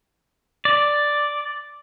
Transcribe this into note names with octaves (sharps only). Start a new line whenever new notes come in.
D5